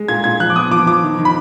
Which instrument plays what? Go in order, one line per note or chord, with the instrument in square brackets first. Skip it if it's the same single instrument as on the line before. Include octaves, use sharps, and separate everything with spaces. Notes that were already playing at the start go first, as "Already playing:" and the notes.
Already playing: [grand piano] G#3
A#2 G#6
A#2 G#6
F3 F#6
D6
B3 D#6
F3 D6
F3 D6
D#3
D#3
B5